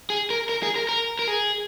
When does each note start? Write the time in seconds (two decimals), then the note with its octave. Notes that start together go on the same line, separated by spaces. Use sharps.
0.10 G#4
0.30 A#4
0.49 A#4
0.63 G#4
0.76 A#4
0.89 A#4
1.19 A#4
1.28 G#4